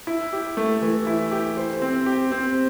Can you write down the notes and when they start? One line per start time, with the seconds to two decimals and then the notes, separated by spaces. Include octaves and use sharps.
0.07 E4
0.33 G4
0.57 A3
0.82 E3
1.07 E4
1.31 G4
1.57 C5
1.82 C4
2.06 G4
2.32 C4